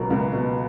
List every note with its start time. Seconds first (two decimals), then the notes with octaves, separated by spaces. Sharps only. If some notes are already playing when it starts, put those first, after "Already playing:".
Already playing: C#2 B2 F#3 A#3
0.10 C#2
0.33 B2